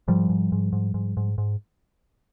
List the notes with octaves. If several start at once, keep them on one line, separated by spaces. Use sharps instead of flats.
G#2 F3 G3
G#2
G#2
G#2
G#2
G#2
G#2